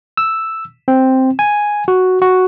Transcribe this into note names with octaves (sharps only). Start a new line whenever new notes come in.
E6
C4
G#5
F#4
F#4